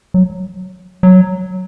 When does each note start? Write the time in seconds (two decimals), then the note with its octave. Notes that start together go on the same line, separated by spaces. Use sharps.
0.14 F#3
1.03 F#3